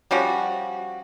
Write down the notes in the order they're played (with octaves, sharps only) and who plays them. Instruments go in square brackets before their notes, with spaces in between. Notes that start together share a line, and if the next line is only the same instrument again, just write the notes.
[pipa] F3 G3 C#4 F#4